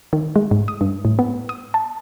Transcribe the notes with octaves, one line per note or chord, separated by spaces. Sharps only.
D#3
G#3
G#2
D#6
G2
A2
B3
D#6
A5